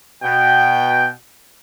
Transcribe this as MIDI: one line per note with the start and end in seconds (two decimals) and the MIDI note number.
0.23 1.08 47
0.23 1.08 79